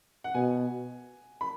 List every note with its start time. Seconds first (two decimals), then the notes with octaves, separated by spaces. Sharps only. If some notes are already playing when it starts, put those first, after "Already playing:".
0.24 F#5
0.34 B2 G#5
1.41 B5